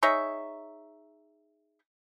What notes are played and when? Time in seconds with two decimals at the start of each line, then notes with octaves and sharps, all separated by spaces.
0.03 D#4 G#4 C#5 E5